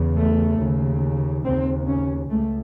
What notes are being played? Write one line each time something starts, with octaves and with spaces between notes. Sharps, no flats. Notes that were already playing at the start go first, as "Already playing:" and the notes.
Already playing: E2 C#3
A3
D#2 C#3
D#2 C#3 C4
C#4
C#2 A3